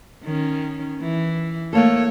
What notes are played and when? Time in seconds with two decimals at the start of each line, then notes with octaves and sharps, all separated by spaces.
0.24 D#3 C#4
1.00 E3
1.73 A3 A#3 A4 C#5